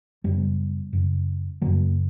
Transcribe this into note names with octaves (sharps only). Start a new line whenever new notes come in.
F#2 C#3 G3 B3
F#2 C#3
F#2 C#3 F#3 A#3